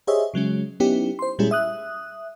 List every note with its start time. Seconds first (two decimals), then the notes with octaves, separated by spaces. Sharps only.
0.07 G4 G#4 C5 C#5 D#5 E5
0.34 C#3 F#3 G#3 C#4
0.80 F#3 B3 C#4 D#4 E4 G4
1.19 C5 C6
1.39 A#2 G3 G#3 C#4 E4 G#4
1.51 E5 D#6 F#6